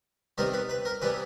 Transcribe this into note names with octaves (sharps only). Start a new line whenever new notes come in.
C3 D#3 G3 B3 A#4
B4
B4
A#4
C3 E3 G3 B3 B4